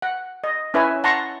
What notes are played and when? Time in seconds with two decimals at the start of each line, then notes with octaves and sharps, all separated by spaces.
0.02 F#5
0.44 D#5
0.74 C#4 E4 B4 C#5 E5 G#5
1.04 F#5 A5 A#5 C6 C#6